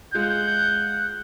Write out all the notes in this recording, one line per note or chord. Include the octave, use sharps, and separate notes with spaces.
G#3 F4 F#5 G6